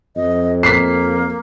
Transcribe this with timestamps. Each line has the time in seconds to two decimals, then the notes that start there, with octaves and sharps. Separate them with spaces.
0.16 F2 D#5
0.63 A#3 B6 C7